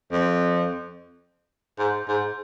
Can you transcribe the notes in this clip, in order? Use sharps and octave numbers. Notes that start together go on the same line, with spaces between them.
F2
G#2
G#2